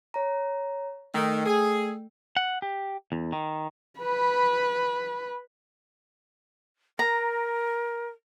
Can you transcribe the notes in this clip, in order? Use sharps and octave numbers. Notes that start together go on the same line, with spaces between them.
C#5 A#5
D#3 A3 G5 E6
G#4
F#5
G4
E2
D#3
B4 B5
A#4 A#5